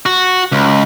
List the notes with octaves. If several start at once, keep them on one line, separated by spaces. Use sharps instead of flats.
F#4
C#2